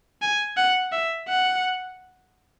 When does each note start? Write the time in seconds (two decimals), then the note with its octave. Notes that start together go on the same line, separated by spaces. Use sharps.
0.22 G#5
0.57 F#5
0.92 E5
1.28 F#5